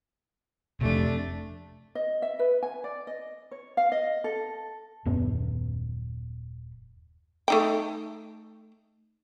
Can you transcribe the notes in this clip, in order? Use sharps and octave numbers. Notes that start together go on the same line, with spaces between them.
F2 C3 A3 D4
D#5
E5
B4
G#5
D5
D#5
C#5
F5
D#5
A4
D#1 F#2 B3 C#4
A3 D#4 G5